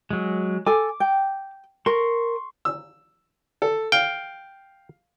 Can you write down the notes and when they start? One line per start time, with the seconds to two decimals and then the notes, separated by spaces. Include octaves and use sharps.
0.11 F#3 G#3
0.66 A4 G#5 D6
1.00 G5
1.86 A#4 C6 C#6
2.65 E6
3.62 A4
3.92 F5 G5